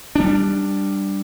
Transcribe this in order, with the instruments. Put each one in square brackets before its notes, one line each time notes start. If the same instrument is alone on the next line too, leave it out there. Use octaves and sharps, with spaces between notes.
[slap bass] G3 D4